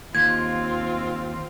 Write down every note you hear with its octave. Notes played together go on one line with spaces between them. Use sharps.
D#2 C4 F4 G#6